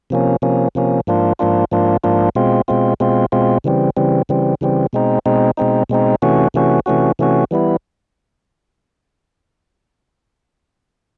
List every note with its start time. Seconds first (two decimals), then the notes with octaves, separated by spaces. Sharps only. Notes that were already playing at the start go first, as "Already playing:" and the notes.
0.10 C3 F3 A#3 C#4
0.42 C3 F3 A#3 C#4
0.75 C3 F3 A#3 C#4
1.07 G#2 F3 A#3 D4 F4
1.39 G#2 F3 A#3 D4 F4
1.71 G#2 F3 A#3 D4 F4
2.04 G#2 F3 A#3 D4 F4
2.35 B2 G#3 C4 F4
2.68 B2 G#3 C4 F4
3.00 B2 G#3 C4 F4
3.32 B2 G#3 C4 F4
3.64 C#3 E3 G3 C4
3.97 C#3 E3 G3 C4
4.29 C#3 E3 G3 C4
4.61 C#3 E3 G3 C4
4.93 B2 G#3 C4 D#4
5.26 B2 G#3 C4 D#4
5.57 B2 G#3 C4 D#4
5.90 B2 G#3 C4 D#4
6.22 C3 E3 A3 C#4 F#4
6.54 C3 E3 A3 C#4 F#4
6.86 C3 E3 A3 C#4 F#4
7.19 C3 E3 A3 C#4 F#4
7.51 E3 G3 B3 E4